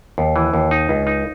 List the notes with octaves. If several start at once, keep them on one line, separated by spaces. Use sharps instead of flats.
D#2
E3
D#2
D#4
C#2
D#4